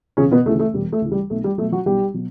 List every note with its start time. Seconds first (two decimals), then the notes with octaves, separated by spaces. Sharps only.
0.17 E1 C#3 C#4
0.32 B2 B3
0.45 D2 C#3 E3 A3
0.59 A3
0.73 E1 G3
0.92 A3
1.02 D2 C#3 E3
1.12 G3
1.30 B1 A3
1.44 G3
1.58 B2 F#3 A3
1.72 F#3 F#4
1.86 B1 G3 G4
2.14 B2 F#3